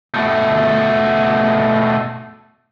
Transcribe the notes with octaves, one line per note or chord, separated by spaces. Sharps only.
B2 A3